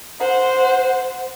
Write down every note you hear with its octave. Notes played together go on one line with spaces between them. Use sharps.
C5 F#5